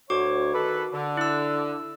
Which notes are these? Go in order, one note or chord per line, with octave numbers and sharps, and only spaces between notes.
D2 F#4 C#5 D6
D#3 A4 B4
D3
E4 E6